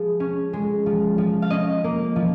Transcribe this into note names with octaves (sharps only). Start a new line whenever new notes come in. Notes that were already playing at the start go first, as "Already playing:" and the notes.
Already playing: F3 G#3 G#4
C#4
G#3
F3
F3
F5
C#4 D#5
A#3
F3